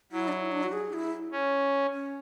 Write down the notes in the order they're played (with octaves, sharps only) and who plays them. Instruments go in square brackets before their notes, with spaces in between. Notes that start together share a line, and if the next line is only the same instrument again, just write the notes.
[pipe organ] F#3 [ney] E4
[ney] D4
E4
D4
F#4
G#4
E4
[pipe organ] C#4
[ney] C#4